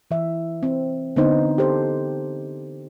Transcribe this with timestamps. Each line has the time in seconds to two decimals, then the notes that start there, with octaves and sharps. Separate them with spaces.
0.11 E3 E5
0.63 C4
1.16 D3 B3 C4 D#4 C5
1.58 G4 A4 C5